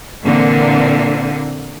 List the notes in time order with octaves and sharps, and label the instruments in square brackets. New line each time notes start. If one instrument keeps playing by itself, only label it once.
[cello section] A#2 D3 E3 A#3 C4